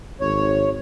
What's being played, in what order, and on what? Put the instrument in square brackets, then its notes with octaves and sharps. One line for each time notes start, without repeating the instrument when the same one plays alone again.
[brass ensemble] G#1 [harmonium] C#5